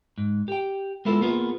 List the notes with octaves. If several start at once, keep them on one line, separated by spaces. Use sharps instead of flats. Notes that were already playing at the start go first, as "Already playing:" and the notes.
G#2
G4 G5
G#3 B3 E4 F4 A4
A#3 B3 F4 G#4